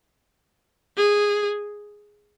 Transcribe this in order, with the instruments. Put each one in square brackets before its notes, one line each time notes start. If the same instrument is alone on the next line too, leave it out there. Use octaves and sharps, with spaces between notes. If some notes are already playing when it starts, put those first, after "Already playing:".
[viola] G#4